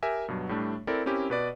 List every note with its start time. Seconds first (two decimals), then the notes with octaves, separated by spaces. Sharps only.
0.03 G4 A#4 E5 G#5
0.28 G2 B2 F#3
0.49 A2 G3 A3 D4
0.87 C4 E4 A4 A#4 D5
1.06 C4 C#4 E4 G4 A#4
1.30 B2 B4 D5